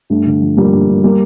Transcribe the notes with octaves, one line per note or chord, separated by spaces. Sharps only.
G2 A3
D3
F3
F3 G3 A#3
G2
G2
G3 A#3